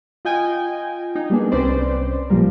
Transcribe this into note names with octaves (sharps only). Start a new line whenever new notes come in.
F4 D#5 G5 G#5
D#4
G3 A#3 B3 D4 G#4
C2 C4 C#4 B4 C5 D5
A1 A#2 F3 G3 A#4